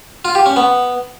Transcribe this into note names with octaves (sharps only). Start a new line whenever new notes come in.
F4
G4
C#4
B3